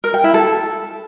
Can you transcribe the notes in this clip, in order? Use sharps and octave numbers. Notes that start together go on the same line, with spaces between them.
A#4
G5
E4
A4